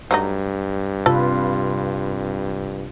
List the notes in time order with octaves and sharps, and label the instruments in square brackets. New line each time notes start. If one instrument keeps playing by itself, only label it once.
[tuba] G2 [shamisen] F#3 A3 D#4
[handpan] C3 F4 B4 [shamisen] A4